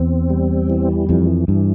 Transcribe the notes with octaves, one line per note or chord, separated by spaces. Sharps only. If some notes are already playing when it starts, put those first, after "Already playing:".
Already playing: E2 C4
G3
E3
F2 E3
G2 E3